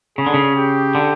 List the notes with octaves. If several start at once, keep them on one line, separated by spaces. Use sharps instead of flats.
C#3 G#4
D3
C#3
G4
D3